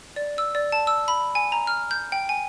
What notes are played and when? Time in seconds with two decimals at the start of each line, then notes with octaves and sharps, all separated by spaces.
0.16 D5
0.38 E6
0.55 D5
0.72 A5
0.87 E6
1.08 B5
1.35 G#5
1.52 A#5
1.67 F6
1.91 G6
2.12 G5
2.29 G#5